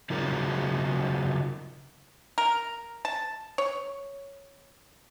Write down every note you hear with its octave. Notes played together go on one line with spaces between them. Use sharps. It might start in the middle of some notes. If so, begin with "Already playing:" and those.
C#3 F#3 D#4 F4 G#4 A#4
A#4
A5
C#5